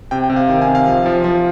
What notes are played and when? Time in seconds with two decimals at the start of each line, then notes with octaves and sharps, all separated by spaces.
0.11 C3 G5
0.24 G5
0.30 C3
0.36 F5
0.49 D#3
0.62 G#5
0.68 C3
0.75 F5
0.87 F3
1.06 F3
1.24 F3